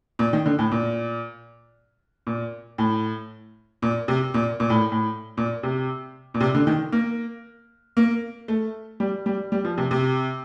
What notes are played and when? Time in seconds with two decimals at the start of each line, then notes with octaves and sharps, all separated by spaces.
0.19 A#2
0.33 D#3
0.46 D3
0.59 A2
0.72 A#2
2.27 A#2
2.78 A2
3.82 A#2
4.08 C3
4.34 A#2
4.60 A#2
4.70 A2
4.92 A2
5.37 A#2
5.63 C3
6.34 A#2
6.40 C3
6.55 D3
6.67 D#3
6.92 A#3
7.97 A#3
8.48 A3
9.00 G3
9.26 G3
9.52 G3
9.65 F3
9.78 C3
9.91 C3